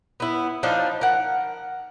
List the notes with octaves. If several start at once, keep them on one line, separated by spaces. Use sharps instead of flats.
B3 E4
F3 D4 D#4
A#4 F#5